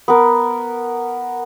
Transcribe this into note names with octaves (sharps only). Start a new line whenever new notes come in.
B3 A#4